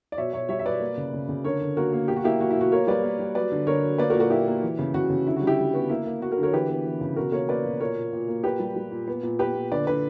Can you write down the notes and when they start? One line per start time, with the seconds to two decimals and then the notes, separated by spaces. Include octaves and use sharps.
0.12 D5
0.17 B2 C#5 E5
0.33 B2 C#5 E5
0.49 G3 C#5 E5
0.59 E5
0.65 B2 B4 D5
0.80 A#3
0.97 C#3
1.13 C#3
1.29 C#3
1.44 D3 A#4 C#5
1.61 D3
1.77 A#3 F#4 A#4
1.93 A#3
2.08 B2 G4
2.16 F#4
2.24 A#3 E4 G4
2.41 A#3 F#4
2.51 E4
2.56 B2 F#4
2.72 A#3 A#4 C#5
2.87 G3 B4 D5
3.04 A#3
3.19 G3
3.35 F#3 B4 D5
3.52 D3
3.67 D3 A#4 C#5
3.83 F#3
3.98 A#3 B4 D5
4.10 F#4 A#4
4.14 A#2
4.20 F#4 A#4
4.30 A#3 E4 G4
4.47 A#3
4.63 E3
4.79 C#3
4.94 C#3 F#4
5.10 C#3
5.26 D3 E4
5.36 F#4
5.41 G3
5.47 E4 G4
5.59 G3
5.74 B3 F#4
5.89 A#3 E4
6.06 A#3
6.21 A#3 F#4
6.32 F#4 A#4
6.37 D3
6.43 A#4 C#5
6.53 E3 G4 B4
6.69 B3
6.85 E3
7.01 C#3
7.16 B2 F#4 A#4
7.32 A#3 A#4 C#5
7.49 A#3 B4 D5
7.65 B2
7.80 A#2 A#4 C#5
7.97 A#2
8.13 A#2
8.28 A#3
8.44 A#2 G4 B4
8.60 G3
8.76 G3
8.91 A#2
9.08 B3
9.23 A#2
9.39 B3 G4 B4
9.55 A#2
9.72 D3 B4 D5
9.87 D3 B4 D5